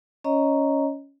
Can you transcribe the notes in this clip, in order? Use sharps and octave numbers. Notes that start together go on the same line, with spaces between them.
C#4 C#5 D#5 A#5